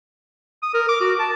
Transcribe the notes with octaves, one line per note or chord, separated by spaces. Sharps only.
D#6
A#4
D6
F#4
A5